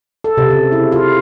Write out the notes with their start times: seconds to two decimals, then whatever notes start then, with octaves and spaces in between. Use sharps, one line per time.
0.24 A4
0.37 C3
0.50 C#3
0.72 E4
0.92 F4